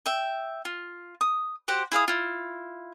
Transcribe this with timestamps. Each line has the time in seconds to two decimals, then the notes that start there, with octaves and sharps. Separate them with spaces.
0.06 E5 G5
0.65 F4
1.21 D#6
1.68 F#4 G4 C5 F#5
1.92 E4 G#4 F5 D#6
2.08 E4 F4